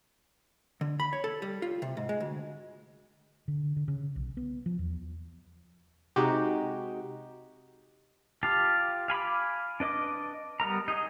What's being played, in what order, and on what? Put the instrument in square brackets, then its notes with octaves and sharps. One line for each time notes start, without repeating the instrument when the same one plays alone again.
[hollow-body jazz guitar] D3
B5
C#5
A4
G3
F4
C3
G#2
G#3
D2
[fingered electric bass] D3
D3
C#3
B1
B3
F3
E2
[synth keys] C3 G#3 D#4 F#4 G4
[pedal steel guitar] F4 G4 F5 A5
F5 G#5 B5 D6
D4 B4 D#5 D6
G3 B3 A#4 A#5
D#4 G#4 D#5